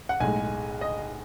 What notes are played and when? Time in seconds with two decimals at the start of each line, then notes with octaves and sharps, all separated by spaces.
0.09 F#5
0.20 B1 A2 G#3 G#5
0.81 D#5